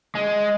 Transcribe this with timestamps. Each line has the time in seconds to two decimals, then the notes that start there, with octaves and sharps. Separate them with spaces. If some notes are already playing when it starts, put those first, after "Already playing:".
0.15 G#3